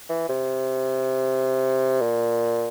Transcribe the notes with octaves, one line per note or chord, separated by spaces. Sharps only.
E3
C3
A#2